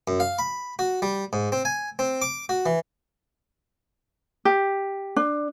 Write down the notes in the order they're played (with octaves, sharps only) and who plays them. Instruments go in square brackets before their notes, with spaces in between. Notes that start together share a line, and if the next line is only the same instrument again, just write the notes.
[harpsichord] F#2
F5
B5
F#4
G3
G#2
C4
G#5
C4
D6
F#4
E3
[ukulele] G4
D4